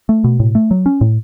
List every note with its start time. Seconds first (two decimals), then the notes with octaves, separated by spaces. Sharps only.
0.09 A3
0.24 B2
0.40 A2
0.55 A3
0.71 F#3
0.86 C#4
1.01 A2